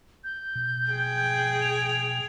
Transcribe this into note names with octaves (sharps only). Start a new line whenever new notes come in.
G6
B2
G#4 G5
F7